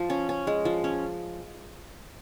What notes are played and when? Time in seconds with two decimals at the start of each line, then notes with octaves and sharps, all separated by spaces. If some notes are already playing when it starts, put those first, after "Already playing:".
Already playing: F3
0.10 C#4
0.29 C#4
0.47 G#3
0.65 F3
0.84 C#4